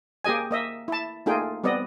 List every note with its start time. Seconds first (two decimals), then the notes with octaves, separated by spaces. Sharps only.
0.24 A#3 G4 G#4 D#5 G#5
0.51 A#3 D#5 E5
0.88 E4 A5
1.26 A3 A#3 D#4 F4 G#4 G5
1.64 G3 B3 C4 D5 D#5